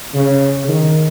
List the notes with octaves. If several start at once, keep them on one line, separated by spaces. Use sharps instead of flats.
C#3
D#3